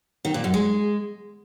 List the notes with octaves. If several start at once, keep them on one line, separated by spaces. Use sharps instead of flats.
D#3
A#2
F#2
G#3